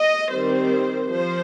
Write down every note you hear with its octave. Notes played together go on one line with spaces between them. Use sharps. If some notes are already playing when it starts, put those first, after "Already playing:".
Already playing: D#5
D#3 G3 C4 C5
F3 C5